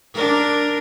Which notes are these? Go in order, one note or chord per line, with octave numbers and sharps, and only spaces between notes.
D4 A#4